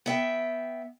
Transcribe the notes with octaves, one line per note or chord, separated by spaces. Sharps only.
B3 E5 G5